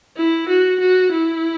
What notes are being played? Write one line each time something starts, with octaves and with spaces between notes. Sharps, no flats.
E4
F#4
F#4
E4